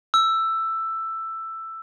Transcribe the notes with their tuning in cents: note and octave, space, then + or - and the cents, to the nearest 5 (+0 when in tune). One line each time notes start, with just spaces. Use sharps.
E6 +10